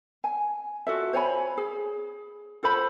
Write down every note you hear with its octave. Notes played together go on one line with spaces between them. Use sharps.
G#5
F4 F#4 A4 E5
C5 C#5 G#5 B5
G#4
F4 A4 C5 B5